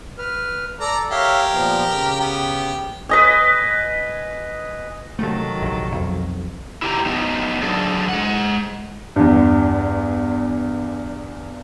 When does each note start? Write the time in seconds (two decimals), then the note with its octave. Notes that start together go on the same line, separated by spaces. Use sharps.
0.18 B4 F6
0.80 A4 D5 A#5
1.11 G4 A#4 C#5 E5 F5
1.54 A#2 F3 B3
1.91 C#3
2.20 B3 G4
3.09 B4 D#5 G#5
5.19 C3 D#3 F#3 A3 A4
5.62 A#1 C3
5.92 B1 F2
6.82 E4 G4 G5 G#5 A#5
7.06 A3 B3 D#4
7.62 F#3 D4 G#4 A4 D5
8.09 G#3 F#5
9.16 E2 G2